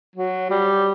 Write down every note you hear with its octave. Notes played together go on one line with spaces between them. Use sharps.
F#3
G3